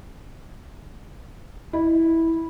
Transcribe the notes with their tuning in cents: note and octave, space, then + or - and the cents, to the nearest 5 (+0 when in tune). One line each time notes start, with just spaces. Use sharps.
E4 -10